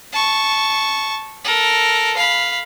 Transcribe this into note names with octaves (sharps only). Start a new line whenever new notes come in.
A5 C#6
A4 A#4
F5 B5